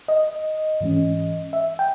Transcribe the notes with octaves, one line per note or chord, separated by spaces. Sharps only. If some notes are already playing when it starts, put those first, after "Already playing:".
D#5
G#2 E3 G#3 C#4
E5
G5